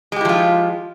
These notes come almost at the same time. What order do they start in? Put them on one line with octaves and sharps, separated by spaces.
G#3 G4 E4 F3 F4